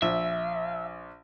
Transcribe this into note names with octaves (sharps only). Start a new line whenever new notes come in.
A#1 E5